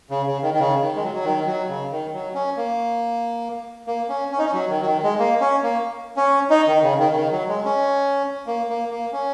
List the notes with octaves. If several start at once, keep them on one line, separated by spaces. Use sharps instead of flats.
C#3
C#3
D#3
D#3
C#3
D#3
G#3
F#3
F#3
D#3
F#3
C#3
D#3
F#3
C#4
A#3
A#3
C#4
C#4
D#4
C#4
F#3
D#3
F#3
D#3
G#3
A#3
C#4
A#3
C#4
D#4
D#3
C#3
D#3
C#3
D#3
F#3
G#3
C#4
A#3
A#3
A#3
C#4